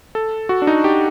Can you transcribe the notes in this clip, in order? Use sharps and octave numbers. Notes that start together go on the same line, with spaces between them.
A4
F#4
D4
D#4
G4